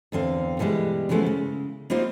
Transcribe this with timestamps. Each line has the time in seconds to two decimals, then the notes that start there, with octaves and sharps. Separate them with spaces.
0.12 E2 D3 C4 F5
0.59 B2 E3 G3 G#3
1.09 C#3 E3 F3 G#3 A3 B3
1.26 C#3
1.90 G3 A#3 C4 D#4 F4 C5